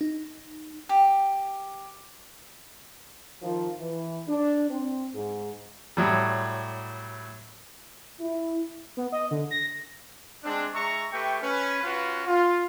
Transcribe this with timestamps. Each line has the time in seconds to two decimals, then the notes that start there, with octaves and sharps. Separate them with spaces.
0.01 D#4
0.89 G4
3.42 D#3 F3
3.80 E3
4.27 D4
4.69 C4
5.13 G#2
5.97 A2 F#3 G3
8.20 E4
8.97 B3
9.12 D#5
9.31 D3
9.51 A#6
10.44 G#3 C4 D4
10.74 G#3 E5 A#5 C#6
11.13 A3 G4 B4 G5 C#6
11.42 C#4 B4
11.83 C#4 F4 F#4 B4
12.27 F4